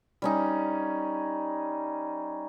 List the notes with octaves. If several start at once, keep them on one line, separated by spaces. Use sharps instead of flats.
G3 C#4 D#4